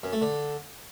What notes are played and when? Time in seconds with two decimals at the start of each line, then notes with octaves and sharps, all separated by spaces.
0.03 F#2
0.12 A3
0.22 D3